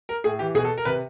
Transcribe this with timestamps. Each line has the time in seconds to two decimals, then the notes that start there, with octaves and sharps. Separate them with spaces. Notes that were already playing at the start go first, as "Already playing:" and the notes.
0.09 A#4
0.24 A2 G#4
0.39 E3 G4
0.55 B2 G#4
0.65 A4
0.78 A#4
0.85 C3 B4